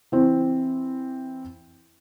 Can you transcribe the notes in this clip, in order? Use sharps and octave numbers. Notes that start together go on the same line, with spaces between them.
E3 C4